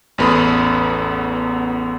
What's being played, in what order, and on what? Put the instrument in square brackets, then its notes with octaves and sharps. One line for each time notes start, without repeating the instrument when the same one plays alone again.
[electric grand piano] A1 E2 B3 A4 B5 D#6